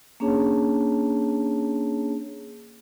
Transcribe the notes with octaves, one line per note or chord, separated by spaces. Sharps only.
A#3 C#4 D4 G#4 C#5 A5